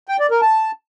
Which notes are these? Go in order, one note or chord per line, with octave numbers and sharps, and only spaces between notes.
G5
D5
A#4
A5